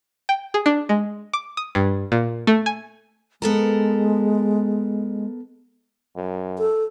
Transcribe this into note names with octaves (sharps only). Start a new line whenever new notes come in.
G5
G#4
D4
G#3
D6
D#6
G2
A#2
A3
G#5
G#3 B3 A4 A#4
F#2
A4